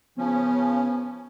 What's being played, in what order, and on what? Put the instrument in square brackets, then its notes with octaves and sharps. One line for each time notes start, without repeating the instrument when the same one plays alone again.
[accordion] C#3 F3 C#4 [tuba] B3